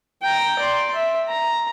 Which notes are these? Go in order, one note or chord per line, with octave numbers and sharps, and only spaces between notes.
G5 A#5
D5 C6
E5
A#5